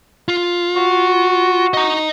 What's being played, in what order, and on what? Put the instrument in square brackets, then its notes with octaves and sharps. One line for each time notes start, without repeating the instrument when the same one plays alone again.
[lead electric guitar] F4
[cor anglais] F#4
[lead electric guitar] D#5 A#5